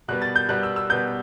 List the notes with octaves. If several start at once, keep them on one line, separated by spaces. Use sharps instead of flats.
B2 G3 B3 F#6
A6
G6
B2 G3 B3 F#6
E6
E6
B2 G3 B3 G6